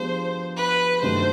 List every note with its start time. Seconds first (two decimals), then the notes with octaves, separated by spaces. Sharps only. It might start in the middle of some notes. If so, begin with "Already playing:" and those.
Already playing: F3 G#3 B3 D4 G4 C5
0.56 B4
1.02 G2 D#3 F#3 A3 C5